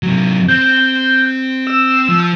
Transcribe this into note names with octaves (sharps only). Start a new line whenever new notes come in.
C3 F#3
C4 G6
E6
F3